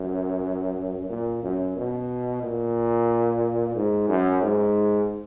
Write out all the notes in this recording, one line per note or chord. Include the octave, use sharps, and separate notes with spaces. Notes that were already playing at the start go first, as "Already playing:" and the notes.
Already playing: F#2
A#2
F#2
B2
A#2
G#2
F#2
G#2